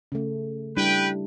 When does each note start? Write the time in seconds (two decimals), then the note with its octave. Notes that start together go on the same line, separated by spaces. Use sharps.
0.12 C#3 A3
0.77 G3 D4 E4 B4 G5